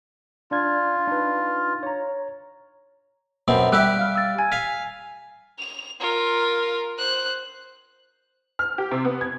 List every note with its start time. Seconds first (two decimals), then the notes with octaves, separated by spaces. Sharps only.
0.51 D4 F4 D5 G#6
1.07 D4 D#4 B4
1.83 C#5 A#5
3.48 F#2 B2 C4
3.72 G3 G4 E5 E6 F#6
3.98 F5 F6
4.16 E6 A6
4.38 G#5 G#6
4.52 F5 G#5 B6
5.59 F7
6.00 F4 A#4
6.98 C5 F#6
8.59 F6
8.78 G4
8.91 C3
9.05 B3
9.21 G#6